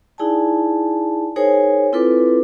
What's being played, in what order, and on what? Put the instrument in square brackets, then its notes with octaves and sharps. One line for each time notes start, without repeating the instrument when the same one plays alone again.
[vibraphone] D#4 E4 G#4 D5 G#5 A5
D#4 G#4 A#4 C5 C#5 G#5
C4 E4 F4 A4 B4 D6